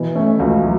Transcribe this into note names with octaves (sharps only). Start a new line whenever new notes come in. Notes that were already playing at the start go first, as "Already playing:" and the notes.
Already playing: B2 E3 E4
A3 C#4
C#2 F#4
F#3